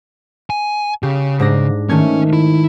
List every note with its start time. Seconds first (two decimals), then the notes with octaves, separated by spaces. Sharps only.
0.50 G#5
1.03 C#3 G4
1.40 G#2 D4 A#6
1.89 D#3 A3 C#4 C#5 G#6
2.33 E4